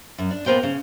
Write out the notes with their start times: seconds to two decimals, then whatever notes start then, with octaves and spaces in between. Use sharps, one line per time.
0.18 F#2
0.31 D4
0.46 A#2 B3 A#4 C5 G5
0.63 C#3